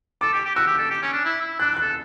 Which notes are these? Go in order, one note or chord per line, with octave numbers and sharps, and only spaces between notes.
A4 D6
G4
G4
F#4 E6
G4
A4
G4
C#4
D4
E4
E4
D4 F#6
F#6
A4